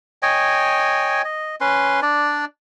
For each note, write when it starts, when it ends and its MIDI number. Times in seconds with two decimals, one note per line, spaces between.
0.22 1.22 73
0.22 1.22 75
0.22 1.22 79
0.22 1.22 80
1.24 1.56 75
1.61 2.00 61
1.61 2.00 71
1.61 2.00 84
2.02 2.45 62
2.02 2.45 74